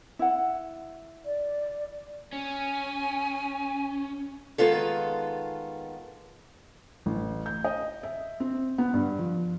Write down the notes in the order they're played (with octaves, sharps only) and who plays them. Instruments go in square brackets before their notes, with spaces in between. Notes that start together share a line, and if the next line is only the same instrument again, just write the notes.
[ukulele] E4 F#5
[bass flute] D5
[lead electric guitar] C#4 [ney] G#5
[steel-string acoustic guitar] D#3 G#3 B3 F4 A4
[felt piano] A1
G6
D#5
E5
C4
B3
G2
F3